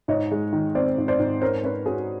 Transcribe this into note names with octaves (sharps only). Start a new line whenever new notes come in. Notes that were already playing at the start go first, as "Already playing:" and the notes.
G#2 C#5 D#5
G#3
D#3
C4 C5 D5
G#2
C5 D5
G#2
C#4 A#4 C5
C#4 B4 C#5
C#4 F#4 G#4